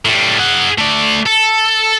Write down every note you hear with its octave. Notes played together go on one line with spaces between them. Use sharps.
A2 G3
G#4 F#5
A3 D5
A4